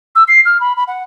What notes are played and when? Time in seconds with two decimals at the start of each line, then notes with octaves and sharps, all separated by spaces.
0.15 E6
0.28 C7
0.45 F6
0.60 B5
0.76 B5
0.88 F#5